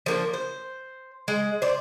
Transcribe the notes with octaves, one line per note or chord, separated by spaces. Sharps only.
F3 A#3 D4
C5
G#3
C5 D5